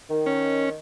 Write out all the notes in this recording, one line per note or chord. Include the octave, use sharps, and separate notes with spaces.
D#3
C#4